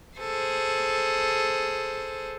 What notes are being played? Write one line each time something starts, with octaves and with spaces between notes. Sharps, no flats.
G#4 A4 C5